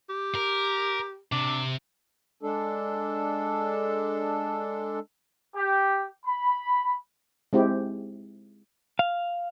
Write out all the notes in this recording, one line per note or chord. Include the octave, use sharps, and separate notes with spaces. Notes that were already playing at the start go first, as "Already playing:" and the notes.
G4
A#4
C3 D4
G#3 D4 A4
G4
B5
G#3 C4 E4 G4
F5